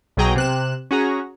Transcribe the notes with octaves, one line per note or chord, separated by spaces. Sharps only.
B1 B2 F#3 G#4 G5 A#5
C3 F#6 E7
C#4 F#4 G#4 A#5